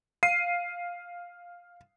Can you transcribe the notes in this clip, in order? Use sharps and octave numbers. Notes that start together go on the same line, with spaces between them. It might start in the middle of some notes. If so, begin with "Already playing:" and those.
F5 C7 D#7